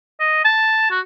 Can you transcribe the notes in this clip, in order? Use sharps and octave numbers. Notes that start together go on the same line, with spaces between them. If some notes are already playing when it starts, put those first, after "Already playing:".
D#5
A5
F#4